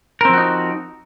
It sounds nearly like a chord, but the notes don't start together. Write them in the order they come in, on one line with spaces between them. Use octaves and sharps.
A#4 C4 F3 F#4 D#4